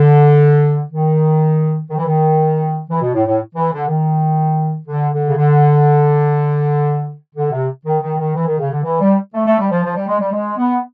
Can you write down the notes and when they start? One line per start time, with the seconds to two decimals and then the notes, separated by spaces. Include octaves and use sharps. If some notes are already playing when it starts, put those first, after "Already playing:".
Already playing: D3
0.92 D#3
1.90 D#3
1.98 E3
2.06 D#3
2.90 E3
3.02 B2
3.15 A2
3.27 A2
3.55 E3
3.73 D3
3.88 D#3
4.87 D3
5.13 D3
5.28 C#3
5.37 D3
7.35 D3
7.51 C3
7.86 D#3
8.02 D#3
8.18 D#3
8.35 E3
8.47 D#3
8.59 C#3
8.71 D3
8.84 E3
9.01 G3
9.34 A3
9.46 A3
9.59 G3
9.71 F3
9.84 F3
9.96 G3
10.08 G#3
10.20 G3
10.32 G#3
10.58 B3